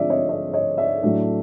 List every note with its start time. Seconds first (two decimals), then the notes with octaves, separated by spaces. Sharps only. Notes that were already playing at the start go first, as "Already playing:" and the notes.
Already playing: D3 F3 G#3 C4 D5 E5
0.10 C#5 D#5
0.29 C#5 D#5
0.53 C#5 D#5
0.78 D5 E5
1.02 A2 F#3 A3 D4